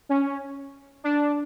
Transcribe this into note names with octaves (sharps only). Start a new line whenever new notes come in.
C#4
D4